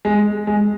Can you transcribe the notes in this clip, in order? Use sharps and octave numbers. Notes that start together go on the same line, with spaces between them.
G#3
G#3